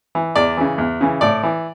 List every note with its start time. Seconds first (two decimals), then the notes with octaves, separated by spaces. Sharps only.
0.15 E3
0.36 E2 D5
0.57 C#3 E3
0.78 E2
1.01 C#3 E3
1.21 A2 D5
1.43 E3